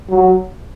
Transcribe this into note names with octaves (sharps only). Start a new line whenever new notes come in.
F#3